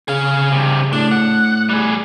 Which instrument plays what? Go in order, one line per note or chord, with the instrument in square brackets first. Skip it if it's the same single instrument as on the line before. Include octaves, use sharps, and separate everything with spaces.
[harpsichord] C#3 [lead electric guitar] G#4 F5
[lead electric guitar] G2 C3
[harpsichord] A2 [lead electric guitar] D4
[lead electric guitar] F#5
G3 G#4